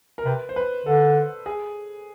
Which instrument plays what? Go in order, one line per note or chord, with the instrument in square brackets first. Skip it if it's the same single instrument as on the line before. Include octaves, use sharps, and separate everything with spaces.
[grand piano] A#4
[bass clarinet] C3 [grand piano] B4
[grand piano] C5
B4
[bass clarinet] D3 [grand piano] A4
[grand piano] G#4